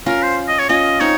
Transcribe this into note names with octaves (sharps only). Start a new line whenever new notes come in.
C#4 F4 A#4
C5
D#5
C#5
C#4 F4 D#5
C4 D#4 C#5